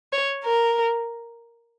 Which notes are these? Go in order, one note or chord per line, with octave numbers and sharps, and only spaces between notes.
C#5
A#4